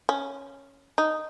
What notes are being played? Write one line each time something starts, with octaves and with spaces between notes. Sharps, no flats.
C#4
D#4